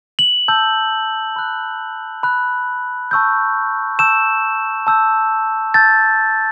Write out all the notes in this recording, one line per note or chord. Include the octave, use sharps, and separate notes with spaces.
F#7
A5 E6 G6
B5 F#6
B5 F#6
A5 C#6 E6 G6
A5 C#6 E6 G6 E7
A5 E6 G6
A5 E6 G6 A6